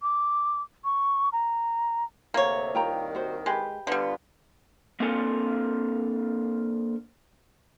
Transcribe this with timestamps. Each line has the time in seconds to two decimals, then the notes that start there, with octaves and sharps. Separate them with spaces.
0.02 D6
0.84 C#6
1.33 A#5
2.34 D2 C3 A#3 C#5
2.75 C2 D#3 F4 G5 A#5
3.15 F#4 C5
3.46 G#3 G4 B4
3.87 D3 G3 B3 F4
5.00 A#3 C4 D4 F4 A4 G#5